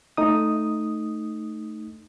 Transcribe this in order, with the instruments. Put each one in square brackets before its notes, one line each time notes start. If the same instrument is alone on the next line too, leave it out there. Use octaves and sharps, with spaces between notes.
[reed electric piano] A3 D#4 D#6